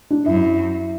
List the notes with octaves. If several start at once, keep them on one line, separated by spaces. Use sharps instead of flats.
D4
F#2 E4